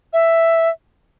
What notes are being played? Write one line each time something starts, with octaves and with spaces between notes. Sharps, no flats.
E5